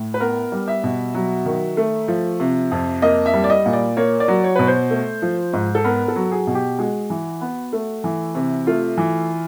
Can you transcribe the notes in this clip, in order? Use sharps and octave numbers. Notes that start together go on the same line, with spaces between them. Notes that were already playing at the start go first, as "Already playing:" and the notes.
Already playing: A2
B4
B3 A#4
G3
E5
B2
F#3
D#3
A3
F3
C3
F2
A#3 D#5
E5
G3
D5
D#5
A#2
D5
A#3 C#5
D5
F#3
C#5
B2 B4
C5
A3
F3
G#2
A4
B3 A#4
A4
F#3
G#4
B2
G4
G#3 F#4
E3
B3
A3
E3
C3
A3 F4
E3